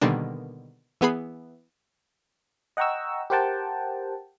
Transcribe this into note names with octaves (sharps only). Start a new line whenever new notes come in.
B2 D3 D#3 G3 A#3 D4
E3 B3 G#4 B5 C7
D#5 F#5 G5 A#5 C#6 E6
G4 A#4 C5 F#5 G5 A5